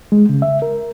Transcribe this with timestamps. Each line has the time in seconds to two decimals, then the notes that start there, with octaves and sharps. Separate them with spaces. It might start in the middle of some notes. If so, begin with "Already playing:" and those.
0.12 G#3
0.29 C#3
0.42 E5
0.62 A#4